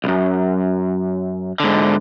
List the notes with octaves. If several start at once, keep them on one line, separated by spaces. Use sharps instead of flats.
B1 F#2
G#2 D3